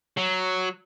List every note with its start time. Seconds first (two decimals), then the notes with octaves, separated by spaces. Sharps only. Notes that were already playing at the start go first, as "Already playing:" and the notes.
0.17 F#3